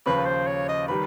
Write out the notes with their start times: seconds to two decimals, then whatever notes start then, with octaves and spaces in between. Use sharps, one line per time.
0.06 D#2 C#3 F3 B4
0.26 C5
0.47 C#5
0.68 D#5
0.88 D#3 G3 B4